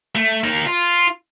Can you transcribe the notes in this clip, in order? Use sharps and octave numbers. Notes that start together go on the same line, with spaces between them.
A3
A#3 D#4
F4